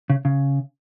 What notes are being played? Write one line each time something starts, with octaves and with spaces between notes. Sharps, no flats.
C#3
C#3